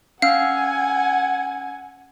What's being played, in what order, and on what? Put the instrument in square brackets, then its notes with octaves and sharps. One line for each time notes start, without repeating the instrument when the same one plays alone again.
[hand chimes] C#4 E6 F6 [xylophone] F5 [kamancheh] F#5 G#5